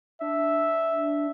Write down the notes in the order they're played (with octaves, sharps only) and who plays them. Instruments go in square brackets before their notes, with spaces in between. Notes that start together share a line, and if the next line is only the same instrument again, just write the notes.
[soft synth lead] D4 [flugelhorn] E5